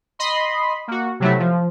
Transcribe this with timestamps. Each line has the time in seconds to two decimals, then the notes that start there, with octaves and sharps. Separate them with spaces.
0.19 D#5 B5 C6
0.88 A#3 F#4
1.20 C3 F#3 A3 E4
1.39 F3